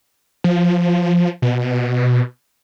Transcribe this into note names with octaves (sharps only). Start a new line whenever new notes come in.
F3
B2